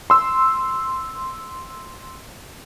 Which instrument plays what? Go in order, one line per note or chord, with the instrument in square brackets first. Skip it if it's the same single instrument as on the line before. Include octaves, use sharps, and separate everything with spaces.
[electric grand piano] C6 E6